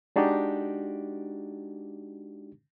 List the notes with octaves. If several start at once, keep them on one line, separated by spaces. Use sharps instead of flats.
G#3 D4 D#4 F#4 G4